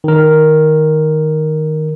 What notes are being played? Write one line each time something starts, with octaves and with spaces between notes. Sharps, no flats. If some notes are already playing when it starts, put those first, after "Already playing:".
D#3 A#4